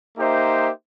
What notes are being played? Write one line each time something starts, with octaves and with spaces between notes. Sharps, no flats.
A#3 D#4 G4 C5 E5